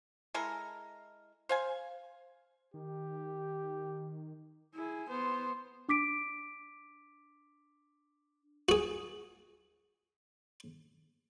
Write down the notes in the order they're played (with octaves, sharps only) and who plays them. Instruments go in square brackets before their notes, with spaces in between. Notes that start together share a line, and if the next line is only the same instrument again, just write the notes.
[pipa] G#3 E4 A4 A#4
C5 F5 G#5
[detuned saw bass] D#3 [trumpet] G4
[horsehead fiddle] E4 G#4
B3 C5
[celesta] D4 D6 B6 D7
[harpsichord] F#4 G#4